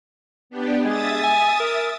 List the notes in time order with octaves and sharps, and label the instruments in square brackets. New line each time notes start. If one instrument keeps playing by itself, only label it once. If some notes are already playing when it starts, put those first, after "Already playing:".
[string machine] B3 D4 G4
[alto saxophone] G#3 [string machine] E5 D#6 A6
[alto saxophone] G#5
A#4